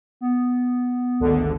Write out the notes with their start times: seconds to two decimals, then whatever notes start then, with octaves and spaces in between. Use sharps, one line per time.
0.21 B3
1.20 G#1 D2 D3